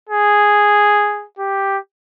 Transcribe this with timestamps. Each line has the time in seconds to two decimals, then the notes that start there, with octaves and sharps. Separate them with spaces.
0.09 G#4
1.39 G4